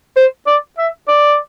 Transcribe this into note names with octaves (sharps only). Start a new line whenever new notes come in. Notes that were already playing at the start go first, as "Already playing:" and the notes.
C5
D5
E5
D5